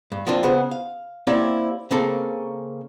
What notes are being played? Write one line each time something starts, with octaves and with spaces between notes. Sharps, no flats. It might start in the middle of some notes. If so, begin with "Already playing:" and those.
G2
F3 A#3 C4 D4 F4
C#3 B3 G#4 C5
F5
A#3 C4 E4 G4 C#5 D5
C#3 A#3 C4 C#4 A4 A#4